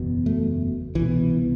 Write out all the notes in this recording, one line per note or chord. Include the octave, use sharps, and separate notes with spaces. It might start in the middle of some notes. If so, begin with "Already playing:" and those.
Already playing: F#1 E2 B2
A3
C2 B2 E3